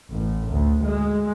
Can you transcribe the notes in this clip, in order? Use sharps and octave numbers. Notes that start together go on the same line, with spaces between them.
A1
D2
G#3